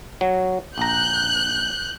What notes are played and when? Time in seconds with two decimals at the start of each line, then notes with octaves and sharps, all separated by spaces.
0.21 F#3
0.78 A#1 A#5 F#6 G6